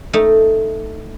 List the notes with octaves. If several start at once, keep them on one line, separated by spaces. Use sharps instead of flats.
A3 D#4